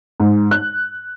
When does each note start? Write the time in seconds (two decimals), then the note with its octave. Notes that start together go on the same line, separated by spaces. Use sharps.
0.20 G#2
0.51 F#6